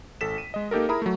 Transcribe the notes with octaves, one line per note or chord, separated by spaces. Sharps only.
G#1 A4 B6 E7
D#7
G#3 D#5
A#3 D#4 G4 A4 A#4
E4 G#4 A#4 A#5 B5 D#6
F#3 A3